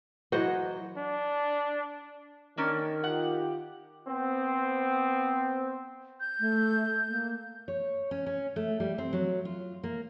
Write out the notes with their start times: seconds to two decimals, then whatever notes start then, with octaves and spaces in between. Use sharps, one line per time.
0.32 E3 F#3 C5 D#5 F#5
0.97 D4
2.58 D#3 A#3 C#4 D4
3.04 F4 G4 F#5
4.07 B3 C4
6.20 G6
6.40 A3
7.08 A#3
7.68 C#5
8.11 C#4
8.26 C#4
8.56 A3
8.80 G3
8.98 C4
9.13 F#3
9.45 F4
9.84 A#3